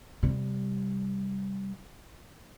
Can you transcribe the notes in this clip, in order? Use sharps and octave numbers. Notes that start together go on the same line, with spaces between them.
C3 G3